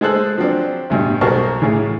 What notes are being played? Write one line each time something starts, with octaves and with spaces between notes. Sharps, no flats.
G#3 G#4 A4 C5 F#6
F3 F#3 C4 D4
A1 G2 B2
B1 F#4 A#4 C5 A5 C#6
A2 C#3 E3